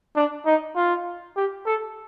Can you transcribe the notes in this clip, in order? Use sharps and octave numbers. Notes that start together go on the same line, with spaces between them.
D4
D#4
F4
G4
A4